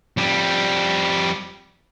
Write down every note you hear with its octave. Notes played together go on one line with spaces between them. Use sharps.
F2 G3